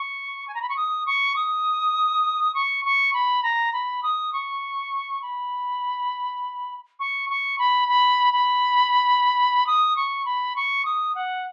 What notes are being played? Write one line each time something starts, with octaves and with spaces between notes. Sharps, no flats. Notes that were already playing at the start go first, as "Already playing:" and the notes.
Already playing: C#6
G#5
A#5
B5
C#6
D#6
C#6
D#6
C#6
C#6
B5
A#5
B5
D#6
C#6
B5
C#6
C#6
B5
B5
B5
D#6
C#6
B5
C#6
D#6
F#5